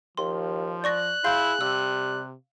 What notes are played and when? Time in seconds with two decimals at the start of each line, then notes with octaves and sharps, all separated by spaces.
0.17 D#2 F3 C6
0.84 D5 C#6 F#6 A#6
1.24 E4 G#4 F5 C6 G6
1.61 C3 G3 E6